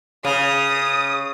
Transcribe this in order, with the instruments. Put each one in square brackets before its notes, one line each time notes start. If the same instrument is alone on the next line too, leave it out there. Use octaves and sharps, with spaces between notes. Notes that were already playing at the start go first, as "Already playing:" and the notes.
[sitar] C#3 [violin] D#6